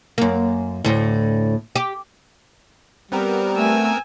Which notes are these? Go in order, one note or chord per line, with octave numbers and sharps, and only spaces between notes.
F#2 A#3
D2 A2
G4
G3 B3 C4 A#4
A3 G#5 E6